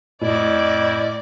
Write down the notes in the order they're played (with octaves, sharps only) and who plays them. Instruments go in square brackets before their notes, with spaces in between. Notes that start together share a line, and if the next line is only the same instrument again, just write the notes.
[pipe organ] F2 E4 [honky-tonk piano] A2 [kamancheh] D5 [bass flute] D#5